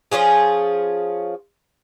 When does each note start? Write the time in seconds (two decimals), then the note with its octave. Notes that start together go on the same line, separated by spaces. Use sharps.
0.12 F3 C#4 F4 G#4